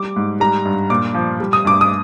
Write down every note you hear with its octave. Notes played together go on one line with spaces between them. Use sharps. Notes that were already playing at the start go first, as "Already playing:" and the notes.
Already playing: G3 D6
G#2
G3 A#5
G2
A#2 D6
F3
G3
D#6
G2 D6
D#6